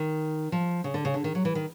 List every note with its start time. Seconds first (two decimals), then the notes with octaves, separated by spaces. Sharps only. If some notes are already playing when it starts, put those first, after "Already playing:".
Already playing: D#3
0.52 F3
0.84 C#3
0.94 D3
1.05 C#3
1.14 D3
1.24 D#3
1.35 F#3
1.45 E3
1.55 D#3